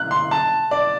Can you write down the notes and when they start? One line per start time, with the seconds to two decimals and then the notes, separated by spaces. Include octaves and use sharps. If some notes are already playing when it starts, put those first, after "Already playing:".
Already playing: F#6
0.11 C6
0.31 A5
0.71 D5